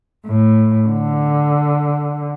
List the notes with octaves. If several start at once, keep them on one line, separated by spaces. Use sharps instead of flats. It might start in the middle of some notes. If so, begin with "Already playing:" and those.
A2
D3